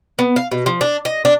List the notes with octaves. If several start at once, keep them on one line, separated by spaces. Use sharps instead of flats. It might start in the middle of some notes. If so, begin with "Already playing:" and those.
B3
F5
B2
F3
D4
D#5
D4